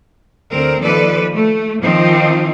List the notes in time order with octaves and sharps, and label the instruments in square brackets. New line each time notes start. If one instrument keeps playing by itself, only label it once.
[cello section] D2 C4 A#4
D#2 F3 A4 B4 D5
A3
D#3 F3 C4 D#4